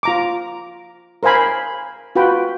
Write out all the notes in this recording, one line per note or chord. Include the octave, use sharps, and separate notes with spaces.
F4 A#5 D6
A#4 C5 F5 G#5 B5
F4 F#4 B4 G5 B5